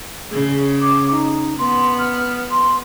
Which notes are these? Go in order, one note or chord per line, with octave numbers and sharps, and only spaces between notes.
C#3 G#4
D6
D#4
B3 C6
F6
C6